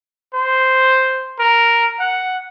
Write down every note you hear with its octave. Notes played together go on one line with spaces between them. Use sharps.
C5
A#4
F#5